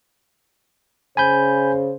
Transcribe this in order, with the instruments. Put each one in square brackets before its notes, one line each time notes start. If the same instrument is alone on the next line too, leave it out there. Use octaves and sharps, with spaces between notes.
[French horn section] C#3 C5 [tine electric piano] G#5 B5 G6